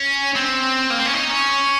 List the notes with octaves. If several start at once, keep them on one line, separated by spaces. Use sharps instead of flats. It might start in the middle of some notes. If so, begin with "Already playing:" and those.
Already playing: C#4
C4
A#3
C4
C#4
D#4
C#4